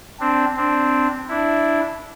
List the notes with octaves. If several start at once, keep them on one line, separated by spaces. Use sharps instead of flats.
C4 D4
C4 D4
D4 E4